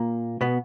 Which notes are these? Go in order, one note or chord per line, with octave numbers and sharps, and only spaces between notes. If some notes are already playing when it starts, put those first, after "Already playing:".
Already playing: A#2 A#3
B2 B3